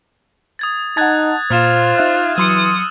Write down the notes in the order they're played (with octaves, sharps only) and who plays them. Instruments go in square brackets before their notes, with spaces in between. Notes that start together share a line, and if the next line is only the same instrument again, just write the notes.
[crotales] D#6 G#6 A6
[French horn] D#4 [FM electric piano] F#5 A5 [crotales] F#6 G#6 A6
[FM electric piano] A#2 [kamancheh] F4 [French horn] C5 [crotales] D#6 F6 E7
[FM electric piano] D#4 E5 F#6
[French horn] E3 [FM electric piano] F#3 C6 C#7 [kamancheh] D#6 [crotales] E6